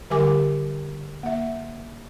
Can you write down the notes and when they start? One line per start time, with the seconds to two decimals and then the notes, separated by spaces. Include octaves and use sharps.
0.10 D3 G3 G4 A#4 G#5 D6
1.23 A#3 E5